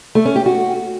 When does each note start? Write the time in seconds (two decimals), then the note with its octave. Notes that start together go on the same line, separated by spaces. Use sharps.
0.15 A3
0.25 C#4
0.36 G4
0.46 F#4